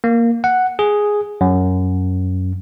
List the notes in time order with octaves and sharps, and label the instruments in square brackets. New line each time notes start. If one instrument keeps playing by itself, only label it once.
[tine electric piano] A#3
F#5
G#4
F#2